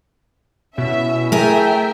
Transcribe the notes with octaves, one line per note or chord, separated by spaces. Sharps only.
B2 C#4 E4 E5
A3 G#4 A#4 E5 G5